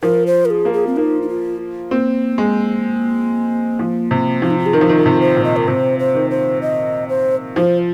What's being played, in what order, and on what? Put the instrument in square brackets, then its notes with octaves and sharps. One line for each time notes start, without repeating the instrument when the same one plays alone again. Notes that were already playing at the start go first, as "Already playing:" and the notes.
[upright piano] F3 [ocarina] A#4
[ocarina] C5
A#4
G#4
[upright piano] A#3
[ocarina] G#4
C4
[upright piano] A#3 [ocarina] D#4
[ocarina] D#4
F4
[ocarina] A#3 [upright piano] C4
[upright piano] G#3
F3
C3
[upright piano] F3 [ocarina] C4
[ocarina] D#4
F4
G#4
[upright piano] D#3 [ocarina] A#4
[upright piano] F3
D#3
[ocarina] A#4
[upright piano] C3
[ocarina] C5
[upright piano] A#2
[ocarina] D#5
A#4
[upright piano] C3 [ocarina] C5
[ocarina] C5
[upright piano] D#3
[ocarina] C5
D#5
C5
[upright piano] F3 [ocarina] C5